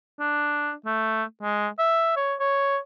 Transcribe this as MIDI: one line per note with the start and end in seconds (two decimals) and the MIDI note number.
0.20 0.73 62
0.86 1.24 57
1.42 1.68 56
1.79 2.12 76
2.17 2.35 73
2.40 2.78 73